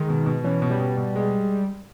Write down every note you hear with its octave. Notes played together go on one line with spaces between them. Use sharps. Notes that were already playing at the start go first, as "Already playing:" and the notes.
Already playing: D#3 G#3
B2
B2
E3 C#4
B2
G3
B2
B2
G#3